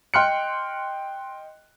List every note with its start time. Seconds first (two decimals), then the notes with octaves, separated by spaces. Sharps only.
0.14 D#5 G5 C6 F6 F#6 C#7